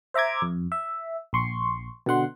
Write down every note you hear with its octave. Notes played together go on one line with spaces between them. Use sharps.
C5 E5 A#5 D6 G#6
F2
E5
A#1 C6 C#6
B2 D3 F#5 C6